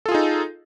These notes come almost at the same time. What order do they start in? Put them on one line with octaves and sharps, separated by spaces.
A4 F4 G#4 D#4